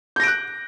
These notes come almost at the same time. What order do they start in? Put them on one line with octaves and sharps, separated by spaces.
G6 A#6 D7 F#6